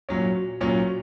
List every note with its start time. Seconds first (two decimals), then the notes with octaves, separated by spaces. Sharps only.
0.09 A#2 F#3 C#4
0.61 A#2 F#3 C#4